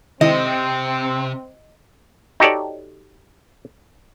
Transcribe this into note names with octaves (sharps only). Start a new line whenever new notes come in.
C3 D#3 G#3 C4 E4 D#5
D#4 F#4 G4 A4 C#5 D5